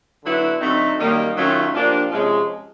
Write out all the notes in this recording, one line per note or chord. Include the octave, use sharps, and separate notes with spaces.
D3 F#3 B3 E4
D3 F#3 A3 C4 D#4
F#2 D#3 G3 A#3
D#3 F#3 A3 C#4 F4
A#2 F3 A#3 D4 G4
C3 F3 G#3 C#4